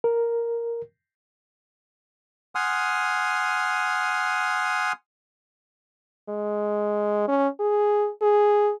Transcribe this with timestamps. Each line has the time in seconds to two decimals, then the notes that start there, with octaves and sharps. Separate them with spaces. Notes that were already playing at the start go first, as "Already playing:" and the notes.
0.04 A#4
2.55 F#5 G#5 C6 D#6 F6
6.29 G#3
7.28 C#4
7.60 G#4
8.22 G#4